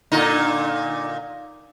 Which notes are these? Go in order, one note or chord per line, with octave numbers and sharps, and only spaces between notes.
A#2 D3 D#4